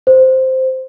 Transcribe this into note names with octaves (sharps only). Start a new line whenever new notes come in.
C5